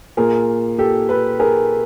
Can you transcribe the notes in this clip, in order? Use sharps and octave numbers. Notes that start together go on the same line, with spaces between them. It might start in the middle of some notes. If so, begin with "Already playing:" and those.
A#2 G#4 A#4
G4 A4
A4 B4
G#4 A#4